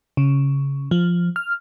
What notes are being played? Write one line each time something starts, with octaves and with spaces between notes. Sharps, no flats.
C#3
F3
F6